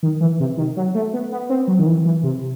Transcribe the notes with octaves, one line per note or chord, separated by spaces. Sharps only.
D#3
E3
C3
D#3
F#3
A3
B3
B3
C4
F#3
D#3
E3
E3
C3